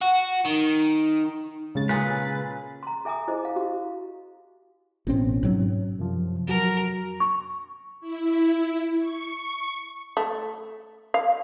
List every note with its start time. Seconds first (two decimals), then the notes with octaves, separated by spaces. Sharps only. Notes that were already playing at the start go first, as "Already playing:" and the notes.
0.01 F#4
0.46 D#3
1.75 C#3 G#3 A6
1.89 A#2 G#4 B4
2.83 A#5 C6
3.05 A4 E5 G#5 A#5 D#6
3.28 E4 G#4 C5 D#5
3.44 E4 F5
3.56 F#4 G4 F5
5.07 A1 B2 C4 C#4
5.43 G#2 F#3
5.99 F#2 C3 F3
6.47 F2 F#3 F#4 A#4
7.20 C#6
8.00 E4
8.99 C#6
10.17 A3
11.14 F5